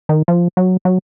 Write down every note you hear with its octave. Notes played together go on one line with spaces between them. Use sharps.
D#3
F3
F#3
F#3